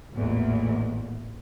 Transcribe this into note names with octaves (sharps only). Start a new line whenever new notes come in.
A1 E2 A#2